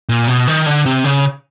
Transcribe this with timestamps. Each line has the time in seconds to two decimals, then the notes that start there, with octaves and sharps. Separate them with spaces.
0.09 A#2
0.28 B2
0.48 D#3
0.66 D3
0.86 C3
1.04 C#3